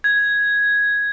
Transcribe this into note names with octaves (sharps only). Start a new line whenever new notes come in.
G#6